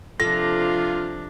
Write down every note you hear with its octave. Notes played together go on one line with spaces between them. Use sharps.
C3 F3 D4 F4 A4 A#6